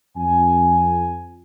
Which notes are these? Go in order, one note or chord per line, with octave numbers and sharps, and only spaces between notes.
F2 G#5